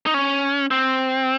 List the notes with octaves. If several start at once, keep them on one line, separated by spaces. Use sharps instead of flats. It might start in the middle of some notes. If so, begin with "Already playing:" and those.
D#4
C#4
C4